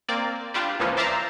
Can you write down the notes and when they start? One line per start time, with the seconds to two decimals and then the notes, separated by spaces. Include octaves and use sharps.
0.09 A#3 C4 D5
0.54 G3 D4 F4 G4
0.79 C#2 A#2 E3 F3 C#4
0.97 C5 D5 E5 F5 A5 A#5